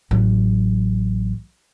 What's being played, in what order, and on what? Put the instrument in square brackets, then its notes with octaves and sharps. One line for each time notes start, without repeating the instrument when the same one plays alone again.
[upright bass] A1 F#3